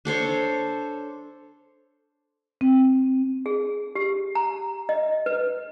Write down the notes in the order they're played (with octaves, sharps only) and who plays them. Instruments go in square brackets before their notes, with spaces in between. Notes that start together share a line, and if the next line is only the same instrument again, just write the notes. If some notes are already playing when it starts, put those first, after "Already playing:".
[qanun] D4 A4 C5 C#5
[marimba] C4
[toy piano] G#4
G4
A#5
D#5
B4